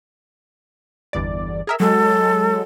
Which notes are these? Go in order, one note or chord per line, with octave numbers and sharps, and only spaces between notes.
G1 E2 D5
G#4 A#4 E5
F#3 G#3 A4